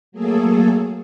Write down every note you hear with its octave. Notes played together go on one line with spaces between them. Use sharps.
F#3 A3 A#3 G#4 A4